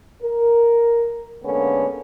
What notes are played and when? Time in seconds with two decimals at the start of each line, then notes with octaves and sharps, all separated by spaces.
0.23 A#4
1.43 D3 G#3 A#3 B3 C#4